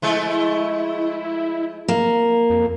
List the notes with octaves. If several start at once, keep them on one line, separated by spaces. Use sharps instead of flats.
F3 G#3 A3 E4
A#3
F2